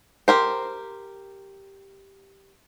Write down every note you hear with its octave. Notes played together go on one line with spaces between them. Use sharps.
G4 A#4 C5